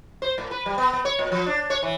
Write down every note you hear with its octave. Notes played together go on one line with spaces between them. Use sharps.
C5
A2
B4
G3
B3
B3
C#5
A#2
F3
D4
C#5
E3